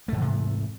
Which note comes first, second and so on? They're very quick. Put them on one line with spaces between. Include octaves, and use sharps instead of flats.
A3 G#2 E3 C3